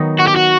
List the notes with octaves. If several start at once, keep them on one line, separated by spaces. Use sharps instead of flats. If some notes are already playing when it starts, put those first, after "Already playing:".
Already playing: D#3 F#3 B3 D#4
F#4
G4
F#4